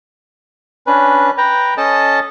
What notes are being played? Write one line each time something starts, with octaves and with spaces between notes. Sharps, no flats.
C#4 D4 B4
B4 G5 A#5
C#4 A4 D#5 A5